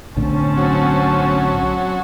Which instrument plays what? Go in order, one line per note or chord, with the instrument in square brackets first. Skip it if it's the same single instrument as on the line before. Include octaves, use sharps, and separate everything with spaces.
[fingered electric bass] B1 A2 D3 [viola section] C4 C#4 A5
[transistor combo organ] F#3